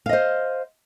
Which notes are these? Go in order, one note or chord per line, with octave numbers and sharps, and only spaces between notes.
C5 D#5 F5